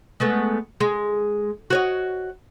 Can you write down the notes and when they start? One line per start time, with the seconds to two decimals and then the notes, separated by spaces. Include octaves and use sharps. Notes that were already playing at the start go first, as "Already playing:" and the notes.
0.20 G#3 A3 B3
0.80 G#3
1.70 F#4 C#5 D#5